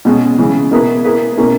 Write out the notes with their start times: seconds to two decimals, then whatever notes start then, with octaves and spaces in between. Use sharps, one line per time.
0.05 B2 G#3 C#4
0.38 C#3 E3 G#3
0.71 B2 A#3 E4 G#4 B4
1.04 A#3 E4 G#4 B4
1.37 B2 A#3 C#4 E4